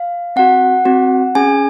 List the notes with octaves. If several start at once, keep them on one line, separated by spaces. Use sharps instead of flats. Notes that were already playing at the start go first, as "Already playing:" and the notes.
Already playing: F5
C4 F#4 F#5
C4 F#4
C#4 G#4 G#5